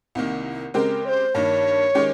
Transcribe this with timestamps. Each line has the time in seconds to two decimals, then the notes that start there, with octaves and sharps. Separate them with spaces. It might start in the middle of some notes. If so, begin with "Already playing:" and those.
0.15 C2 C3 D#3 A#3
0.74 C#3 G#3 C4 G4 A#4
1.05 C#5
1.09 C5
1.35 G2 D#3 A#3 C#5
1.95 D#3 G#3 C#4 G4